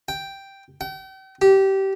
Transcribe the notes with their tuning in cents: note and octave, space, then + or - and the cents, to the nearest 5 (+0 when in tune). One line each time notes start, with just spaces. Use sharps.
G5 +0
G5 -40
G4 -20